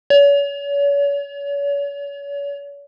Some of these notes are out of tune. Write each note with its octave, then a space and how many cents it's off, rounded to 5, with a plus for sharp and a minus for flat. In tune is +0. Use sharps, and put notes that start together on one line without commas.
C#5 +40